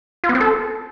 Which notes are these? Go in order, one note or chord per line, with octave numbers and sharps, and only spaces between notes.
F4
B3
C4
A4